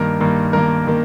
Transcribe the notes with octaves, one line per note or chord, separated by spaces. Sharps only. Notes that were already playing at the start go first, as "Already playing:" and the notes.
Already playing: G2 D#3 A#3 A#4
G2 D#3 A#3
G2 D#3 A#3 A#4
D#3 A#3